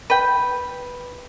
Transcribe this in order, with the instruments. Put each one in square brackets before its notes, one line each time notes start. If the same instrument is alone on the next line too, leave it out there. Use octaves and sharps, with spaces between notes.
[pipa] B4 G5